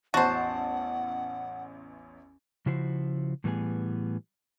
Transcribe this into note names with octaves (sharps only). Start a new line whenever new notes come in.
A1 E2 F#4 C5 C#5 F#5 A5
C#3 F3 E4 F#4 C5
A2 E3 G3 B3 D#4 G#4